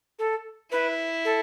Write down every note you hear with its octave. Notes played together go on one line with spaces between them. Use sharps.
A4
E4 B4
A4